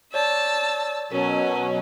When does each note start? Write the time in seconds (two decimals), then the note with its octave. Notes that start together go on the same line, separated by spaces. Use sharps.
0.14 C#5 D5 A5 E6
1.12 B2 F#3 C#4 A#4